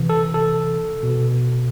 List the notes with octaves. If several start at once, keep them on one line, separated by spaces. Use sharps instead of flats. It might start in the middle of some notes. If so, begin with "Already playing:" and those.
Already playing: C3 E3
A4
A4
B2